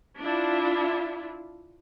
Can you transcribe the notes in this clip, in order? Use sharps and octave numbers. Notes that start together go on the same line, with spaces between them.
D4 E4 F4